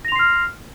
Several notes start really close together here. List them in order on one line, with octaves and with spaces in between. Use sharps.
A#6 F7 C6 C7 F6